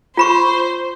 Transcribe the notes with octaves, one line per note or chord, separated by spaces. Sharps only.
F4 C5 B5 C#6